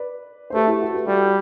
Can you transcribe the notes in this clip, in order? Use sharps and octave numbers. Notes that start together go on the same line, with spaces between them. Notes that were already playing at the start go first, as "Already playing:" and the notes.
Already playing: B4 D5
C5
A3 G4 B4
E4 G4
F#4 A4
G4 B4
G3 F#4 A4